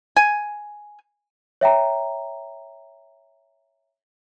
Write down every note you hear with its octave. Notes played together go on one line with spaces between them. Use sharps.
G#5
C#5 E5 G5 A#5